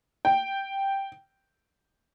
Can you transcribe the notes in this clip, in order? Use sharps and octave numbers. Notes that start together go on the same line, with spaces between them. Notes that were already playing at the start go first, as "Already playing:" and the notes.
G5